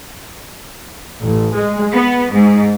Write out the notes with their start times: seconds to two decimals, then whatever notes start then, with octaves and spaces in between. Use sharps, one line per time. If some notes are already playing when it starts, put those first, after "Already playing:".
1.22 A1
1.54 G#3
1.94 B3
2.33 G#2